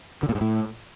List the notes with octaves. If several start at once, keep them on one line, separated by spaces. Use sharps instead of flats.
D3
A#2
G#2
A2